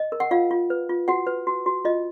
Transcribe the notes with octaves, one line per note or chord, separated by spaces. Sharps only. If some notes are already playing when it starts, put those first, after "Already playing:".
Already playing: D#5
A#4
F#5
F4 F5
F4
B4
F4
F#4 F#5
B4
F#4
F#4
F4 D#5